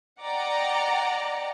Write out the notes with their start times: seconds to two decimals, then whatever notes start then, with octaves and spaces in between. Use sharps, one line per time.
0.21 D5 D#5 F#5 G5 A#5 D6